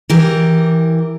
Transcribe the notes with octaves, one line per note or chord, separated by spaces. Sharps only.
E3 G4 A#4